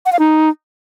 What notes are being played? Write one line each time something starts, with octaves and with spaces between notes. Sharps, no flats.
F#5
F5
D#4